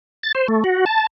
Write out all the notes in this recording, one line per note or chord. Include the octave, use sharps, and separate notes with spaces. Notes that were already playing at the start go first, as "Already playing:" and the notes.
A6
C5
A3
F#4
A5